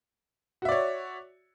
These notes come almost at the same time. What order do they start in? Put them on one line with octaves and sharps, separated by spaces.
F#4 E5 D5 C#5